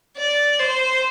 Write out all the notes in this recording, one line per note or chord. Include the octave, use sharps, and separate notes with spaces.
D5
C5